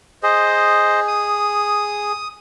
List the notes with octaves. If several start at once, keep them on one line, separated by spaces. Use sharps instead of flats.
G#4 C5 D#5
D#6